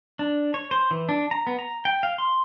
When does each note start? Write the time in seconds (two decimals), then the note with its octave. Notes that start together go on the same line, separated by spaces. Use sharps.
0.19 D4
0.54 C#5
0.71 C5
0.91 E3
1.09 D4
1.31 A#5
1.47 B3
1.59 A#5
1.85 G5
2.03 F5
2.18 C6